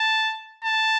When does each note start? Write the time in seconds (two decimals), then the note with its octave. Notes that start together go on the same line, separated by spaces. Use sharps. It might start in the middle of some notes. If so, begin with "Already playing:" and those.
Already playing: A5
0.64 A5